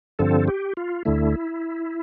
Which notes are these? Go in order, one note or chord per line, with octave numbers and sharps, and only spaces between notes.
G2 D3 F3 C4 A4
G4
F4
D2 D3 A3 E4